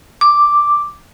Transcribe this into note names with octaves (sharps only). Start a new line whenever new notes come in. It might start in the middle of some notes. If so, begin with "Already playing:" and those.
D6